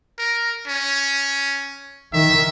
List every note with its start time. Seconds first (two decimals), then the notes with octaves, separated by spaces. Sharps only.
0.19 A#4
0.68 C#4
2.13 D#3 E5